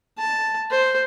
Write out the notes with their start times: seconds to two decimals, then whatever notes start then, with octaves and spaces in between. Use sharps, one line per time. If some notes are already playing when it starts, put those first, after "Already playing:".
0.18 A5
0.71 C5